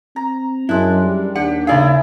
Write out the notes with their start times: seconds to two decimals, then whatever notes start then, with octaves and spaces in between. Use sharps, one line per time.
0.16 C4 A#5
0.69 F#2 G#3 D4 E4
1.03 G3
1.36 D#2 D4 G4 F#5
1.67 C#3 D#4 E4 G#4 D5 F5